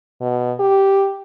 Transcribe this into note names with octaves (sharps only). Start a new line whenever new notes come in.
B2
G4